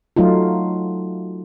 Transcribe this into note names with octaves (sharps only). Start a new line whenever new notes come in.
F#3 A3 D#4 F4